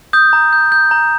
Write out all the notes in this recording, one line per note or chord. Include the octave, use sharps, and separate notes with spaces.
D#6 G6
A#5
G6
G6
A#5